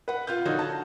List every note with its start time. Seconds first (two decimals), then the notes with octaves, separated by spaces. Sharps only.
0.08 B4 F#5
0.27 F4 F6 G6
0.45 D3 D#4 F#4 C#5
0.59 A5